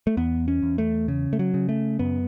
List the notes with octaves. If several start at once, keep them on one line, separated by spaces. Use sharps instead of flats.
A3
E2 B3
C#4
E2
A3
C#3
A3
F#3
C#3
A3
F#2 B3